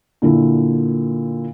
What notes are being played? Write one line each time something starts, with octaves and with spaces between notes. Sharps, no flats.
A#2 D3 E4